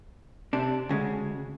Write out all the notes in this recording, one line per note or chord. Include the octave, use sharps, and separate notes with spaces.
C3 D4
D2 C#3 G#3